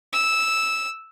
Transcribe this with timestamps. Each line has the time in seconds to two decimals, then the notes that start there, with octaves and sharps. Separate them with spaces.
0.13 E6